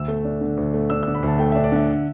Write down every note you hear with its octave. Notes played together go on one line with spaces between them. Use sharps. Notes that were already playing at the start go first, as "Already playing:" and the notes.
Already playing: D2 E6
A3
D4
D3
D2
A3
D4 E6
E6
D3
B5
D2 A5
A3 G5
D4 E5
D5
D3 E5